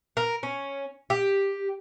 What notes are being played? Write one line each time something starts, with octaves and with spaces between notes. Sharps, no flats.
A#4
C#4
G4